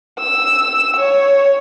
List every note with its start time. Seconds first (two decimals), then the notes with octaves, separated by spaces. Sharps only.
0.20 E6
0.97 C#5